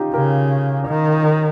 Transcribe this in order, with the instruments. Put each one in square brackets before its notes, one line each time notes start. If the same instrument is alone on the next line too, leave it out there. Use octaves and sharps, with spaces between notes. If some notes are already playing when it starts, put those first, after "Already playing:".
Already playing: [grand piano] C#4 D#4 F4 G4
[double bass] C#3 [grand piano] G4 A#4
[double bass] D#3